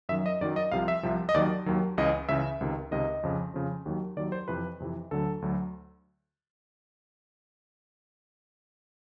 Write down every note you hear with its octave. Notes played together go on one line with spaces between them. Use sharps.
F#2 D#3 F#3 E5
D#5
F#2 D#3 F#3 D5
D#5
C2 C3 F3 F5
E5
C2 C3 F3
D#5
D#2 D#3 F#3 D5
D#2 D#3 F#3
C#2 C#3 E3 D#5
C#2 C#3 E3 E5
C#2 C3 D#3
C#2 C3 D#3 D#5
F2 C#3 F3
F2 C#3 F3
D#2 D#3 F#3
D#2 D#3 F#3 D5
C5
F2 C3 E3 B4
F2 C3 E3
D2 D3 F#3 A4
D2 D3 F#3